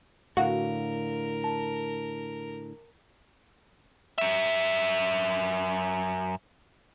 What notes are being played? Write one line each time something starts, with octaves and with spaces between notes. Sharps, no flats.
A2 D3 F#4 A#4 F5
A5
F#2 E5